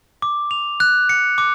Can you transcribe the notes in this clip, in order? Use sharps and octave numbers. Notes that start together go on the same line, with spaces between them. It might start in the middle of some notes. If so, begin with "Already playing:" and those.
D6
F7
F#6
C#7
D6